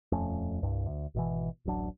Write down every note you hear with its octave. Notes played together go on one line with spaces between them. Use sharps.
D#1 F2 A3 C#4
C2 G2
D2
G#1 B2 E3
D1 A1 F#3 D4